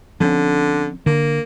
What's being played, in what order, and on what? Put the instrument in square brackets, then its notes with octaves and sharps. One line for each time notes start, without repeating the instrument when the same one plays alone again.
[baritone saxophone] D3 [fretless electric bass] F3 C4 C#4
[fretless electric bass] D3 [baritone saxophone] A#3